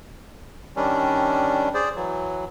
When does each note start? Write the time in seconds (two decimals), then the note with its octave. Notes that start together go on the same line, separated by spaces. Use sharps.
0.76 D#3 G3 C#4 D4
1.74 G#4 C5 D5
1.96 E3 F#3